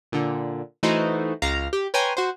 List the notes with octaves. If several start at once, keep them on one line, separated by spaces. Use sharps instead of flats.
A#2 D3
E3 A3 D#4 E4 F#4 C5
C#2 F5 A#5
G4
B4 C#5 G5 G#5 A#5 C6
F#4 C5